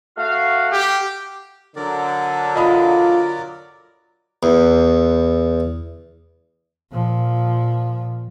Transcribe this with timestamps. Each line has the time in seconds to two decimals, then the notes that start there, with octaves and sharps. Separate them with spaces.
0.17 A3 F#4 F5
0.72 G4
1.76 D3 F#3 A#4 D5
2.56 F4 D#5 B5 D#6
4.43 E2
6.92 A#2 F3